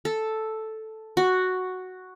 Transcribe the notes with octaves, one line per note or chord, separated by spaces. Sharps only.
A4
F#4